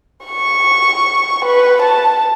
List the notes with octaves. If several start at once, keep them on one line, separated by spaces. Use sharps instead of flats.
C#6
B4
A5